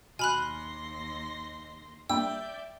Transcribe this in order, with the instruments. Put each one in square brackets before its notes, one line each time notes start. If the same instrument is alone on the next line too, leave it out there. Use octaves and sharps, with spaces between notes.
[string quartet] D#2 C6 A#6 [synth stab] B2 F6 [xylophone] G#5 B5 F#6
[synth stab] G2 G3 A#3 [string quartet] D5 E5 G6 [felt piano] G5 [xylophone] E6